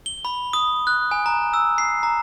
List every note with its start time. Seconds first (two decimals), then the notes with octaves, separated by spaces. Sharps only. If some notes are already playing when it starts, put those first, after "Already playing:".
0.06 G7
0.25 B5
0.53 D#6
0.87 F#6
1.11 G#5
1.26 A#5
1.54 E6
1.78 C7
2.03 A#5